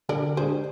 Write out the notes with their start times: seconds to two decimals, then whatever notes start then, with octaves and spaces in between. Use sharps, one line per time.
0.09 D3 A#4 D5
0.36 G#3 D4 G4 G#4 C5